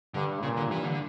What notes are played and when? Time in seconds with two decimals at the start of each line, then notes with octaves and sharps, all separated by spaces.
0.14 G2 D3
0.43 A#2 C#3
0.57 D3
0.71 G2 E3
0.85 D3